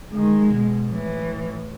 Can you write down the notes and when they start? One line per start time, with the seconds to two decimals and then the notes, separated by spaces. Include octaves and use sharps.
0.13 D#3 G#3
0.51 B2
0.90 A2 E3